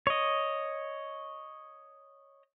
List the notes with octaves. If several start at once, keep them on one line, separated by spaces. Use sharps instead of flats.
C#5 D#5